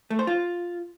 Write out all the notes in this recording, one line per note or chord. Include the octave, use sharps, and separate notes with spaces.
A3
C5
F4